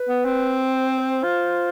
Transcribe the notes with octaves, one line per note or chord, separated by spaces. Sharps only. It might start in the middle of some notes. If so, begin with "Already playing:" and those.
Already playing: B4
B3
C4
C5
C5
F4